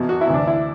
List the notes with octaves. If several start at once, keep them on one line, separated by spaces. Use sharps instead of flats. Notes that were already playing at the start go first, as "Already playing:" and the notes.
Already playing: E2 B2
F#4
E4
D2 C3 E3
D4
E4